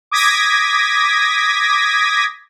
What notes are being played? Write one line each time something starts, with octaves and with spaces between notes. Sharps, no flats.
D6 D#6 G#6 A#6 B6